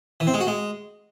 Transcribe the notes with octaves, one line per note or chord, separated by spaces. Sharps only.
E3
C4
G#3
F#4
G#3